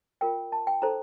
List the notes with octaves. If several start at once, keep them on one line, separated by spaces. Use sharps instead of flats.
F4 A#4 G5
A5
G5
D#4 A4 C5 A#5